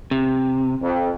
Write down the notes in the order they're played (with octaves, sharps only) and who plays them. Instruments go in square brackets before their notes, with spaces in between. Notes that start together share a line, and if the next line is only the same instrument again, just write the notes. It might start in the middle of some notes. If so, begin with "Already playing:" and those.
[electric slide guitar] C3
[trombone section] F2